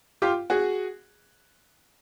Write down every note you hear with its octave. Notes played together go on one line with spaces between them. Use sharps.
F4 G4
F#4 G#4